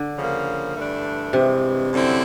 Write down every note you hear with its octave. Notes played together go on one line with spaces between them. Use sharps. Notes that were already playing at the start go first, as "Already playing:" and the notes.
Already playing: D3
C#3 F3 A#3
G2 E3 A3 D4
G2 C3 E3 G#3
F#2 D3 G3 C4 E4